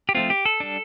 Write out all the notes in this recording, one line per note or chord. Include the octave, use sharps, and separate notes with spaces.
G4
F3 A3 C4 F4
G4
A4
G3 D4